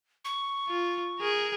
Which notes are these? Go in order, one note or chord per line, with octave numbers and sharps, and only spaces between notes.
C#6
F4
G#4 A#4